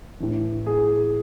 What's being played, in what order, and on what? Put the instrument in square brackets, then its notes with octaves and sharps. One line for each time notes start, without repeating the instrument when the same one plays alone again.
[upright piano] A2 E3
G#4